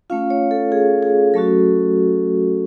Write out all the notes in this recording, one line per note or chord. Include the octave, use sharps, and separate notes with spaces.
A3 C#4 F4 F5
C#5
A4
G#4
G#4
F#3 A3 C#4 F#4 A4